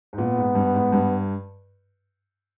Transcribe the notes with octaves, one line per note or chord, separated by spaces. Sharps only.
G#2
A#2 B3
G#2
G2
G#2
G2